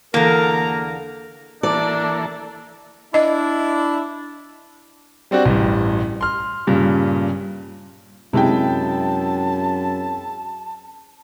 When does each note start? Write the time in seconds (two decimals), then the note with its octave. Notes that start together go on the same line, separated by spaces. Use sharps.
0.14 E2 D3 A#3 A4 A#4 A#5
1.63 E3 A#3 D4 A4 D5
3.14 D4 E4 D#5
5.31 G3 C4 D4 F#4
5.46 A1 G2
6.21 C6 F6
6.67 G2 A#2 C#3
8.33 F#2 C3 G#3 E4 G5 A5